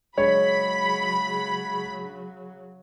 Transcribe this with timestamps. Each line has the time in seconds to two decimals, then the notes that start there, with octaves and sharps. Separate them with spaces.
0.18 C#3 F#3 G#3 D4 C#5 B5